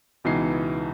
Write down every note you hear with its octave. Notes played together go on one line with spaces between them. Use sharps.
C#2 B2 E3 D#4 C7